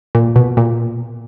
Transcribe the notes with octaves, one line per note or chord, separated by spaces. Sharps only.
A#2
B2
A#2